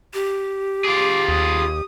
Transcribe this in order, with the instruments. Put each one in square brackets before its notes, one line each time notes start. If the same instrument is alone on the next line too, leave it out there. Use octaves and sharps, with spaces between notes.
[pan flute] G4
[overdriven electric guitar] F4 G#4 [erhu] D6
[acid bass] D#2 [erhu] D#6